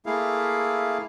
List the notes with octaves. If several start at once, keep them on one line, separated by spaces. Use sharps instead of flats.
A3 A#3 E4 G#4 F5